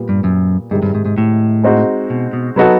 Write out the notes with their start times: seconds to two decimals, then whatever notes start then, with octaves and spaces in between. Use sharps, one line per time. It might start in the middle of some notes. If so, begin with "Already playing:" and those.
Already playing: A#2 G3 B3
0.09 G2
0.24 F#2
0.71 G2 C3 D#3 G#3
0.83 G2
0.95 G#2
1.06 G#2
1.18 A2
1.63 G#3 C4 D#4 F#4
2.10 B2
2.33 B2
2.56 C3 F#3 B3 D#4 F#4 A4